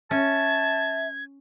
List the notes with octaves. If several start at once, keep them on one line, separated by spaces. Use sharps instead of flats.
C#4 E5 A5 G#6